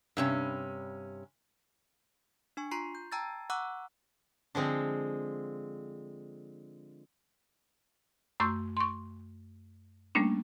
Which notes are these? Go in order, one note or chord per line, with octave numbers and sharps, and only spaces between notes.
G2 C3 C#4
D4 G#5 C#6
F4 A#5 C6 C#6 C7
G6
G5 A5 A#5 E6 G#6 A6
F#5 A#5 C#6 D6 E6 F#6
D3 F3 G#3 C4
F#2 A3 C6 C#6 E6 G6
C6 C#6
G3 A3 A#3 C#4 D4